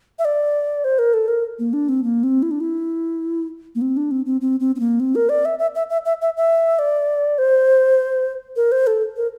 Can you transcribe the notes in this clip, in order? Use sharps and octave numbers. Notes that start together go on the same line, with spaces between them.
E5
D5
C5
A#4
A4
A#4
A#3
D4
C4
A#3
C4
E4
D4
E4
A#3
C4
D4
C4
C4
C4
C4
C4
A#3
C4
A#4
D5
E5
E5
E5
E5
E5
E5
E5
D5
C5
A#4
C5
A4
A#4